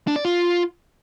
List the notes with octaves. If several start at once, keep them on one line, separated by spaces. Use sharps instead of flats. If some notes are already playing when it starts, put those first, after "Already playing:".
D4
D5
F4